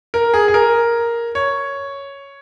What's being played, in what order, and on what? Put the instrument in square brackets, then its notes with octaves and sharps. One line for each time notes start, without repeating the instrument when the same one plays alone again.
[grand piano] A#4
G#4
G#4
A#4
C#5